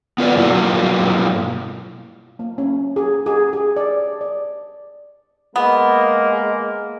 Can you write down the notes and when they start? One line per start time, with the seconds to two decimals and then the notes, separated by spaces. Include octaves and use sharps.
0.18 B3 F4 B4 D5
0.36 G2 B2 F#3 A#3 E4 F4
2.39 A#3
2.58 C#4
2.96 G#4
3.26 G#4
3.53 G#4
3.77 D5
4.21 D5
5.56 G#3 A#3 B3